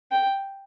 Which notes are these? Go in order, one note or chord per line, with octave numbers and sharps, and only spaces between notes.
G5